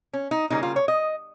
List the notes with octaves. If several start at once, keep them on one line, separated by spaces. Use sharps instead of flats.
C#4
D#4
C#3 G3 A#3 D#4
F4
C#5
D#5